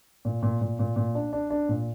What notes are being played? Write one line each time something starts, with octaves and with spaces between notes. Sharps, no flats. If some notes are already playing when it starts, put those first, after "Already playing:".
A#2
A#2
A#2
A#2
A#2
D4
D4
D4
A#2